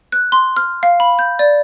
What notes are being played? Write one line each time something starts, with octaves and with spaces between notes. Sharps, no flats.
F#6
C6
F6
F5
B5
G6
D5